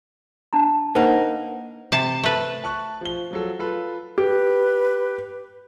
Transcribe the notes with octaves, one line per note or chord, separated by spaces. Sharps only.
D4 A5 A#5
A#3 D#4 B4 C5 F#5
C3 A5
A3 B4
A5 C#6 F#6
F3 G7
F3 F#3 A4
F4 A4 B4
G4 B4